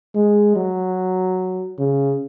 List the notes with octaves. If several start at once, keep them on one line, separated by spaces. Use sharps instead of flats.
G#3
F#3
C#3